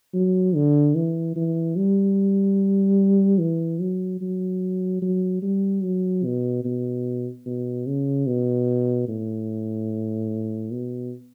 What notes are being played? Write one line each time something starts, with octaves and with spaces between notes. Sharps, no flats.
F#3
D3
E3
E3
G3
E3
F#3
F#3
F#3
G3
F#3
B2
B2
B2
C#3
B2
A2
B2